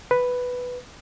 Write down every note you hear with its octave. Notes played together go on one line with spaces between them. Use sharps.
B4